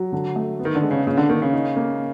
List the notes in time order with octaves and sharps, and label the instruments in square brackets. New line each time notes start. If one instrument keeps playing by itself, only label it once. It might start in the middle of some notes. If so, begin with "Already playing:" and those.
Already playing: [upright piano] F#3
D3
A3
B3
[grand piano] D#3
D3
[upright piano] G#3
[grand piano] C#3
[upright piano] A#2 [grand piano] C#3
[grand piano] D3
[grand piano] D#3 [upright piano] A#3
[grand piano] C#3
[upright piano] D#4
A#3